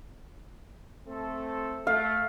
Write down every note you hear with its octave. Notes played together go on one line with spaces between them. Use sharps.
A3 C4 A4
A3 F5